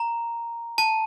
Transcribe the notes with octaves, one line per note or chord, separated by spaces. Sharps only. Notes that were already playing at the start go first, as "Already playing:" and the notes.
Already playing: A#5
A5